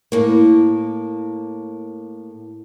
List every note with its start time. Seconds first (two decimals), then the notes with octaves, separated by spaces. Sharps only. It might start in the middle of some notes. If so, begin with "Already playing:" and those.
0.12 A2 A#3